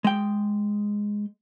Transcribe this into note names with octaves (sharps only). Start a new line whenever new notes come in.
G#3 G5